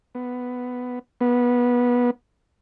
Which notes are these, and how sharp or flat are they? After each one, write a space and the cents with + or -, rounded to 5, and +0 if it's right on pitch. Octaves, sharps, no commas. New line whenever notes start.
B3 +5
B3 -20